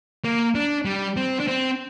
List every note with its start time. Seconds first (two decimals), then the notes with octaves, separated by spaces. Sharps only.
0.24 A#3
0.55 D4
0.85 G3
1.17 C4
1.40 D4
1.48 C4